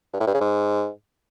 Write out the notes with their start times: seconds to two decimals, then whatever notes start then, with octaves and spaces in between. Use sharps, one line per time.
0.13 G2
0.20 A2
0.27 G2
0.34 C#3
0.41 G#2